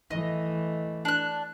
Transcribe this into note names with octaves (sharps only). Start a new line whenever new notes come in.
E3 A3 D#5
D4 F#6